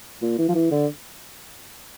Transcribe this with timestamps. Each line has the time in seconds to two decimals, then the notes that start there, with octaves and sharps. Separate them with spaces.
0.22 A#2
0.39 E3
0.49 F3
0.55 E3
0.71 D3